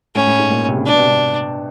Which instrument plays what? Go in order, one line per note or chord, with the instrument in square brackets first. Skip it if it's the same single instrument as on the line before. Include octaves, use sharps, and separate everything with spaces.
[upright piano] A2 [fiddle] C#4
[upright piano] A2
G#2
A#2
C3
C#3
[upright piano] D3 [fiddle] D4
[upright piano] B2
C3
C3